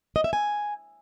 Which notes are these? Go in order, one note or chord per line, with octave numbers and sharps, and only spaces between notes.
D#5
E5
G#5